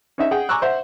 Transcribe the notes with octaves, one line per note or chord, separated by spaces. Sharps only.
C#4 D#4 E5
G#4 F#5 G5
G#5 A#5 C#6 D6 E6 F#6
C5 E5 F#5